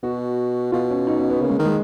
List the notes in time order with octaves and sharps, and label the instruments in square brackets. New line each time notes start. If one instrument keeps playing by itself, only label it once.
[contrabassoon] B2 [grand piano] F#4
[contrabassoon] B2 [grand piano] F4
[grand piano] C#4
D#4
C#4
B3
[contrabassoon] C#3 [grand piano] A#3
[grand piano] G#3
[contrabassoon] D#3
[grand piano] G#3